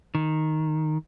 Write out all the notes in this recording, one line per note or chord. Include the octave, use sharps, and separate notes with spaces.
D#3